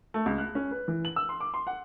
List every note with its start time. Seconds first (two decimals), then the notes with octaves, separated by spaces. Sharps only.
0.14 A3
0.26 C#2
0.38 F#6
0.55 C#4
0.71 B4
0.88 E3
1.05 F#7
1.16 E6
1.29 C6
1.40 D6
1.54 C6
1.67 F#5